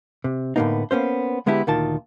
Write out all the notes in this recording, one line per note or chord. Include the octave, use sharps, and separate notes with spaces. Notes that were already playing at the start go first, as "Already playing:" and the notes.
C3
A2 D3 F3 A#3 B3 D#4
A#3 B3 C#4 C5
D3 G#3 B3 D4 E4 G4
D2 A#2 D#3 F4 A5